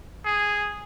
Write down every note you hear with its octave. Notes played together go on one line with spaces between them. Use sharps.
G#4